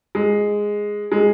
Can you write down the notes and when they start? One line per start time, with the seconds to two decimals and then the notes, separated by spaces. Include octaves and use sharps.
0.15 G#3
1.12 G#3